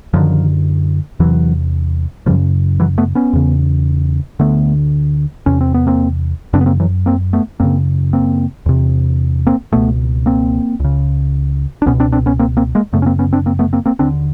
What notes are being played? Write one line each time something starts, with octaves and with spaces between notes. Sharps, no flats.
F#2 D3 D#3 F3
E2 C3 E3 F#3
F#2 C#3 F3 G3
E3 F#3
A3 B3
B3 C#4
E2 C#3
D2 D3 A3 B3
E2 C3 C#4
C4
B3
A#3 C4
F#2 C#3 C4 D4
B3
A#3 C4
E3 F#3
A#3 C4
A3 B3
F#2 C#3 A#3 C4
A#3 C4
E2 C3
A#3 C4
C#2 B2 A3 B3
A#3 C4
C#2 C#3
D4
C#2 B2 B3 C#4
C4 D4
C4 D4
B3 C#4
A#3 C4
A#3 C4
G#3 A#3
F#2 C#3 A3 B3
C#4
A#3 C4
B3 C#4
C4 D4
A#3 C4
A3 B3
A#3 C4
A#3 C4
D#2 D3 C4 D4